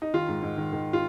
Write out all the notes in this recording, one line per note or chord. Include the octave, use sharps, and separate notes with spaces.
D#4
D#3 F4
G#2
G#2
D#3
D#3
F4